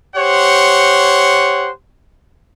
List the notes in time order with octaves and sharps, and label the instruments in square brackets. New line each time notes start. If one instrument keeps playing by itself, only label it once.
[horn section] G4 C5 C#5 F#5